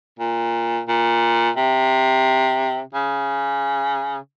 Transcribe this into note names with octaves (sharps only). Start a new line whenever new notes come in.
A#2
A#2
C3
C#3